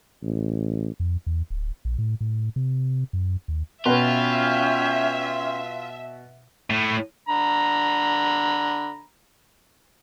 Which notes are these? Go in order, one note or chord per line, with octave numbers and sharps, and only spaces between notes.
A1
F2
E2
D1
A#1
A2
A2
C3
F#2
D#2
B2 C#4 F4 B4 E5 G5
A2
D3 A#5 B5